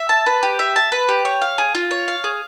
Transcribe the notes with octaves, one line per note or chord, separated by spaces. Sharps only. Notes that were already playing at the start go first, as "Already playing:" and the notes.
Already playing: E5
A5
B4
G4
E5
A5
B4
G4
C#5
F5
G#4
F4
C#5
F5
G#4